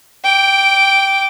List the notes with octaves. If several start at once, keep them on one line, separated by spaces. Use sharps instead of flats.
G5 D6